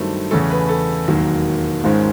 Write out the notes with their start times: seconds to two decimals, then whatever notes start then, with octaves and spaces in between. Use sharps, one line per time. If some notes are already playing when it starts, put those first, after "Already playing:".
Already playing: G2 D#3 F#3 A3 C4
0.31 E2 C#3 E3 A3 C#4 A4
0.50 B4
0.69 A4
1.08 E1 D#2 D#3 F#3 A#3
1.84 G#1 G#2 D#3 G#3 C#4 F4